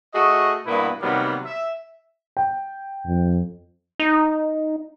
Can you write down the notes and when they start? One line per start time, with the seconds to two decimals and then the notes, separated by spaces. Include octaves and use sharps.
0.14 A3 F#4 G#4 D#5
0.67 G2 B2 A#3 B3 E4 B4
1.02 C3 D#3 F#3 G3 A#3 B3
1.45 E5
2.37 G5
3.06 F2
4.00 D#4